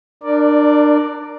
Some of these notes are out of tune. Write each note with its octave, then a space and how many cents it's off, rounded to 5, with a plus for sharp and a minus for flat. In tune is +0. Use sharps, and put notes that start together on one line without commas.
D4 +25 A#4 +0 D5 +0